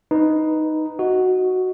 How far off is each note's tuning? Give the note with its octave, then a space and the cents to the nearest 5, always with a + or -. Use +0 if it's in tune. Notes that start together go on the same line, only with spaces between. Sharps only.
D#4 +0 B4 +0
F#4 +0 D#5 +10